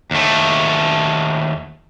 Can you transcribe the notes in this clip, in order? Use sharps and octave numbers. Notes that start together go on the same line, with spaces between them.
D#2 A3